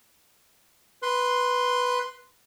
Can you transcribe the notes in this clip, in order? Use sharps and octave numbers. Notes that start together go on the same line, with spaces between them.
B4 C6